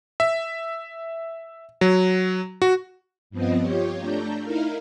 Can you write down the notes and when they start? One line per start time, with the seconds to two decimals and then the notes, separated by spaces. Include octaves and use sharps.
0.20 E5
1.81 F#3
2.62 F#4
3.30 G2 F3 B3 C4 D#5
3.61 F4 G4 C#5
3.98 A3 D4 A#5 G6
4.42 D#4 E4 A#4 F5